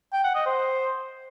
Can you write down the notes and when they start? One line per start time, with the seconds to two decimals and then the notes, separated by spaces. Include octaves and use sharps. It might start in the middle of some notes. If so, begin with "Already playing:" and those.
0.13 G5
0.24 F#5
0.35 D#5
0.46 C5